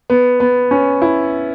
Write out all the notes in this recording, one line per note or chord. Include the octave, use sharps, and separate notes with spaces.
B3
B3
C#4
E4